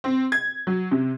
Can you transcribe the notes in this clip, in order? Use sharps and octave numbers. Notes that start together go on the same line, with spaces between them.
C4
G#6
F#3
C3